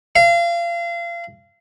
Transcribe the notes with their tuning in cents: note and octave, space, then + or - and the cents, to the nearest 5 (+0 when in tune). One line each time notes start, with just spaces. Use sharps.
F5 -30